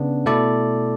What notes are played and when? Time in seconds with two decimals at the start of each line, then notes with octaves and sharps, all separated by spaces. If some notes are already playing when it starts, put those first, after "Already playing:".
Already playing: C#3 B3 D4
0.26 B2 A3 E4 A4 D5